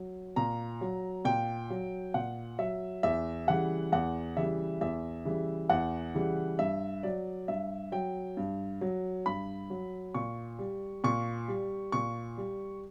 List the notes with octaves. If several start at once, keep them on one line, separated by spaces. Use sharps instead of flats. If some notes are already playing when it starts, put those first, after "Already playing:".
Already playing: F#3
A#2 A#5
F#3
A#2 G5
F#3
A#2 F#5
F#3 E5
E2 E5
C#3 E3 G3 F#5
E2 F#5
C#3 E3 G3 E5
E2 E5
C#3 E3 G3
E2 F#5
C#3 E3 G3
G2 E5
F#3 D5
G2 E5
F#3 G5
G2
F#3
G2 B5
F#3
A#2 C#6
G3
A#2 C#6
G3
A#2 C#6
G3